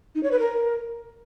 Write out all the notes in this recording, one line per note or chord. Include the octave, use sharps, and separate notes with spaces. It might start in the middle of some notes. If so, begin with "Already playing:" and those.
D#4
C#5
B4
A#4